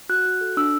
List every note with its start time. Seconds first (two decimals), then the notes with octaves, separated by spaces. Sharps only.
0.09 F#4 F#6
0.25 F#4
0.41 A4
0.57 D4 E6